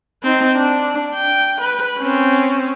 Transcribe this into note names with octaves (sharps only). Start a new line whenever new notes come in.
C4 D#4
D4
G5
B4
C4 C#4